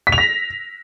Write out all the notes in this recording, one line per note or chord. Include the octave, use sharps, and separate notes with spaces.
B6
F7
A#6